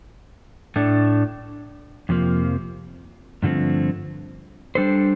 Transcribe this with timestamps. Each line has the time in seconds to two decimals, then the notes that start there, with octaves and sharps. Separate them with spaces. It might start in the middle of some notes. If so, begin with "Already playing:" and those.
0.76 A2 A3 D4
2.09 F2 C3 F3 A#3
3.43 G2 D3 F3 A3 C4
4.75 G3 D4 A4 C5